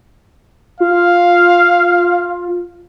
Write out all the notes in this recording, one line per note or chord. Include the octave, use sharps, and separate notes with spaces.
F4 F5